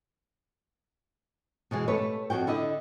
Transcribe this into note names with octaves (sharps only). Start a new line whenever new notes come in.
B2 E3 G#3
A3 G4 A4 B4 C#5
F2 F3 F#4 G5
D3 E4 D#5